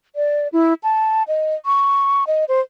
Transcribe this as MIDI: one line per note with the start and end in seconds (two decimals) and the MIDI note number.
0.16 0.48 74
0.53 0.74 64
0.83 1.23 81
1.28 1.55 75
1.66 2.24 85
2.27 2.45 75
2.48 2.61 72